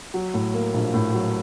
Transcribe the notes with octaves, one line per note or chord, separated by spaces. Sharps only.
F#3
A2
A#3
A#1
A2
F#3